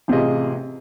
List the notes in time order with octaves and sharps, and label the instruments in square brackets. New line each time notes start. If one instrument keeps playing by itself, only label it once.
[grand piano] A1 C3 F4 G#4 D#5